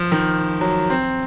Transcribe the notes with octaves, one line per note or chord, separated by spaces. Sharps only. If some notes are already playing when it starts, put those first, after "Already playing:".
Already playing: F3
D#3
F#3
C4